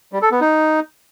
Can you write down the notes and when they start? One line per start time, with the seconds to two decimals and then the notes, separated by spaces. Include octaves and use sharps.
0.13 G3
0.22 A4
0.31 B3
0.41 D#4